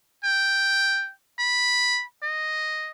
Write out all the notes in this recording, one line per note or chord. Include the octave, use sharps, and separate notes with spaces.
G5
B5
D#5